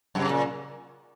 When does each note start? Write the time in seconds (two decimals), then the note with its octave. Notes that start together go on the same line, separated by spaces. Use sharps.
0.15 F#2 C#3
0.29 A#2